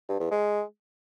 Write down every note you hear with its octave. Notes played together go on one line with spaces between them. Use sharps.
G2
E2
G#3